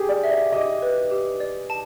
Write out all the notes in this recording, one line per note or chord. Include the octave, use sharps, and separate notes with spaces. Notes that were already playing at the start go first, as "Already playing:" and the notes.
Already playing: G4 G#4
D5
E5
D5
G4 D#5
B4
G4
D5
A5